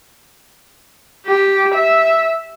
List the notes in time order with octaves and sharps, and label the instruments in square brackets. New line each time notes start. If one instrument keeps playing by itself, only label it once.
[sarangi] G4
E5